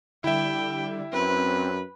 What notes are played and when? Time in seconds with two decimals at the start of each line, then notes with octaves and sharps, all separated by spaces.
0.24 D3 G3 E4 E5 G5
1.13 F#2 C4 B4